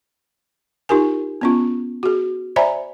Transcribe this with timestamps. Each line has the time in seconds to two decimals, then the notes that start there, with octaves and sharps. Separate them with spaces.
0.89 D#4 F4 G4 A#4 G#5
1.41 B3 C#4 F4
2.03 F#4 G#4
2.56 C5 D5 E5 G#5 A#5 B5